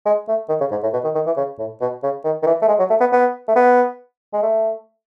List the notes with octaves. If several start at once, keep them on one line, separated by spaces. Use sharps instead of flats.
G#3
A3
D#3
C#3
G#2
A2
B2
D#3
D#3
E3
C#3
A2
B2
C#3
D#3
D#3
E3
A3
G#3
F#3
A3
B3
B3
A3
B3
G#3
A3